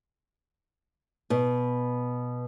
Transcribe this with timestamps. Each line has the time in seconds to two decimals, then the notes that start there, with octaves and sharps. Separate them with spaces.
1.30 B2